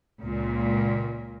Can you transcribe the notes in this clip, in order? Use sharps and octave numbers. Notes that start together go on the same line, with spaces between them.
C#2 A#2